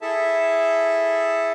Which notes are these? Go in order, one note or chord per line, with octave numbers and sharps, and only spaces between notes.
E4 G#4 A4 E5 A5